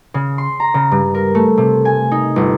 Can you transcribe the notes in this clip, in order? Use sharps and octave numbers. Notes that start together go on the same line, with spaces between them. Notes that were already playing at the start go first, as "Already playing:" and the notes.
C#3
C6
A#5
C#3
G2
A#4
A3
C3
G#5
D#4
G1